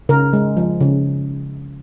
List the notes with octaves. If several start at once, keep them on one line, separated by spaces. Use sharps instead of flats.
C#3 A#4
G#3
F3
C#3